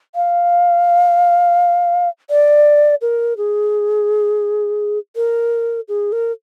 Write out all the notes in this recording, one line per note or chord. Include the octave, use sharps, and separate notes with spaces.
F5
D5
A#4
G#4
A#4
G#4
A#4